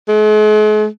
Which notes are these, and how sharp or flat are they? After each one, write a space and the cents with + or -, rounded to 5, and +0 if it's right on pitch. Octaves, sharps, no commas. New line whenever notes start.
G#3 +45